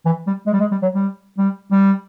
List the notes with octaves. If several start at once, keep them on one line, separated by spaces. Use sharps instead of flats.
E3
G3
G#3
G3
G#3
G3
F#3
G3
G3
G3